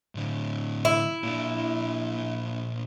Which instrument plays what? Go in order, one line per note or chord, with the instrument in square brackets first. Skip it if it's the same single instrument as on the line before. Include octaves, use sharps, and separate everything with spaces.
[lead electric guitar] A2 D3
[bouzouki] E4
[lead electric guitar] A#2 D4